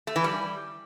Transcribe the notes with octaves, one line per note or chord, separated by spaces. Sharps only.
A3
E3
G3